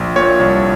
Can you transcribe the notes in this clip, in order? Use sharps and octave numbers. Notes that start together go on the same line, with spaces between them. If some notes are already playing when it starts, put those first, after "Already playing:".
Already playing: A#1
A#2 C#5
C2